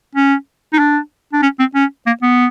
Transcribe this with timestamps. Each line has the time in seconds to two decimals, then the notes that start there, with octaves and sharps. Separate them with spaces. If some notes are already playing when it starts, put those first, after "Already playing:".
0.15 C#4
0.73 D#4
0.79 D4
1.33 D4
1.43 C#4
1.59 C4
1.75 C#4
2.07 A#3
2.22 B3